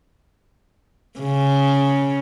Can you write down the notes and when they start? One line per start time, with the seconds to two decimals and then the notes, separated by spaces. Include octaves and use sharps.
1.20 C#3